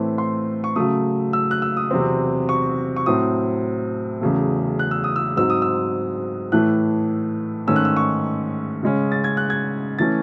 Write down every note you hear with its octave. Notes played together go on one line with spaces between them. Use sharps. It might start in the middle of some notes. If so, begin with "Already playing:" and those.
Already playing: A2 E3 A3 C4
C6
C#6
C#3 F#3 A3 D#6
E6
F#6
E6
D#6
E2 C3 F#3 C4
C#6
C#6
A2 F#3 C4 D#6
E2 C#3 F#3 A3
F#6
E6
D#6
E6
G#2 F#3 C4 E6
D#6
E6
A2 E3 A3 F#6
G#2 D#3 A3 C#4 E6
F#6
E6
C#6
C#3 G#3 C#4
A6
G#6
F#6
G#6
E3 A3 C#4 A6